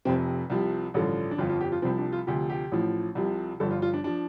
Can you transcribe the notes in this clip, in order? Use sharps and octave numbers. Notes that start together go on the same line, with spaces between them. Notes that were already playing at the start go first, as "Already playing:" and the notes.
F1 F2 C3 C4
C2 C3 F3
A1 G2 D3 F3
D4
G1 F2 F3 F4
F4
G4
F4
C2 C3 F3 C4
D4
F4
D2 C3 F3 G4
G4
A1 A2 F3
C2 C3 F3
G1 G2 F3 A4
F4
F4
D4
F3 D4